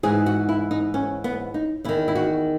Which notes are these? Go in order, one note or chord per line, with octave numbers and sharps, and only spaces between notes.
G#2 E3 G#4
F#4
E4
D#4
C#4
B3
D#4
E2 D#3 E4
E4
F#4